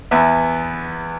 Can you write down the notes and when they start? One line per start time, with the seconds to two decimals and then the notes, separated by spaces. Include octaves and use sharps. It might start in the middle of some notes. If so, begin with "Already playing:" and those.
0.11 E2 B3 E5